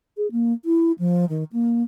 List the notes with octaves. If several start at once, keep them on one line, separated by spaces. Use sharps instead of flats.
G#4
A#3
E4
F3
D#3
A#3